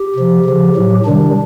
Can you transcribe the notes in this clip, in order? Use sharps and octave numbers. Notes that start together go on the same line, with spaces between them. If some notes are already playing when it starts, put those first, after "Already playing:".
Already playing: G4
C3 F3
C#3 F3
A2 F#3
C3 D#3 G3 D4